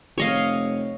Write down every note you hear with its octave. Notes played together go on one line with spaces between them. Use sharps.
F1 C#5 D#5 F5